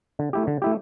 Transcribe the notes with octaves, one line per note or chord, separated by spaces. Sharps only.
D3
A3 E4 G4
D3
A3 E4 G4